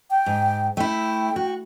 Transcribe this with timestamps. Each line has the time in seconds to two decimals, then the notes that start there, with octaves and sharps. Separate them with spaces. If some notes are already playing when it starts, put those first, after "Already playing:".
0.11 G5
0.26 G#2
0.77 A3 E4 G5
1.36 F#4